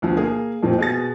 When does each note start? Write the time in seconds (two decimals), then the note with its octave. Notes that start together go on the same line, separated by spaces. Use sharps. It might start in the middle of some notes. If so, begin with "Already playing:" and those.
0.02 D2 B2 F3
0.17 A#3 G#4
0.63 F2 A#2 F3 C4
0.78 B2 G#4 A6